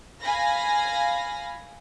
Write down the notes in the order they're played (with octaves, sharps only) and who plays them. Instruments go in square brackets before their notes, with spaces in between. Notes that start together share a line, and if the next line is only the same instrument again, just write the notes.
[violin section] F5 G#5 B5 A#6